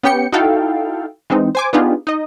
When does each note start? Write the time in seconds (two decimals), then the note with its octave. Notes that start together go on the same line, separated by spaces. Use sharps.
0.03 B3 C#4 G4 G5 C#7
0.32 D#4 E4 F#4 A4 F5 G5
1.30 E3 G#3 C4 D#4
1.55 C5 G#5 D6
1.73 B3 D4 D#4 F4 G4 G#4
2.07 D#4 D#5